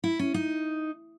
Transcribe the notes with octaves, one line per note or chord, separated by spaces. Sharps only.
E4
C#4
D#4